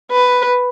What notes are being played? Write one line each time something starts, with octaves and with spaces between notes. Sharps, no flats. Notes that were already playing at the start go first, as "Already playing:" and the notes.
B4